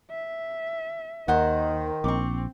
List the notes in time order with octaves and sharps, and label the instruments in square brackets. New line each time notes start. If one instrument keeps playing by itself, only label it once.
[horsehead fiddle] E5
[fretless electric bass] D#2 [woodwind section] D#3 [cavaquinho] C5 F#5
[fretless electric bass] A#1 [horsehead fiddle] C4 [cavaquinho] C#6 D6